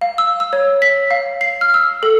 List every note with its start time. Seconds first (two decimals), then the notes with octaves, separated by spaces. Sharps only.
0.01 F5
0.18 E6
0.40 E6
0.53 C#5
0.82 B6
1.11 F5
1.41 C7
1.61 F6
1.74 E6
2.03 A4